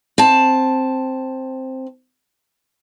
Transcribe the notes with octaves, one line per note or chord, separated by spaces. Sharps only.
C4 A5